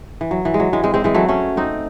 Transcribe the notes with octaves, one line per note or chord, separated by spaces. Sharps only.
E3
F#3
E3
G#3
F#3
E3 G#3
G#3 C4
G#3 C4
E3 G#3
F#3 A3
A3 C#4
C4 D#4